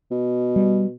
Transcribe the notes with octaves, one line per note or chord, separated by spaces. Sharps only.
B2
G3